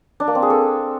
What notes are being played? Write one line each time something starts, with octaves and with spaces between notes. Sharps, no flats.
D4
A#3
C4
G#4
A4